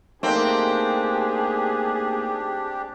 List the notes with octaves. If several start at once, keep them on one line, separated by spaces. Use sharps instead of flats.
A3 A#3 C4 D4 D#4 G4 G#4